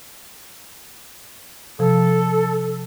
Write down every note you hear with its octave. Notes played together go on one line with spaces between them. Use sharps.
C3 F3 A4